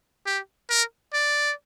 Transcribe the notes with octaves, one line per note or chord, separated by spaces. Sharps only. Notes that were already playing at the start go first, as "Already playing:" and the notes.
G4
A#4
D5